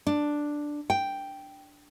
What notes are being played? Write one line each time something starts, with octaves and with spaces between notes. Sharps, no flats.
D4
G5